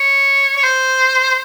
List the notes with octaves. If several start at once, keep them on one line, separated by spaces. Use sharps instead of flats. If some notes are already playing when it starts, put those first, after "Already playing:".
Already playing: C#5
C#5
C5